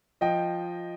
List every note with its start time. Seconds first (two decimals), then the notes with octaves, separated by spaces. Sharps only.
0.21 F3 D#5 G5